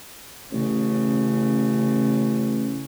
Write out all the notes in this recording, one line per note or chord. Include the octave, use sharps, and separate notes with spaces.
A1 C#3